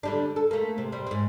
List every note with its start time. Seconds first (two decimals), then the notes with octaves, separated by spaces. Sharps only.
0.03 D3 G3 D4
0.36 A4
0.51 A3 A#3
0.78 C3
0.92 C3 G3 C4
1.07 G#2 C4